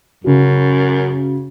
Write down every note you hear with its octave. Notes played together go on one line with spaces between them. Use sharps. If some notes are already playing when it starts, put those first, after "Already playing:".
F#2 C#3 F#4